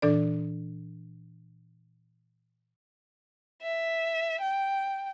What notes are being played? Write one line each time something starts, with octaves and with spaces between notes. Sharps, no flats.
A#2 E3 D4 A4 D5
E5
G5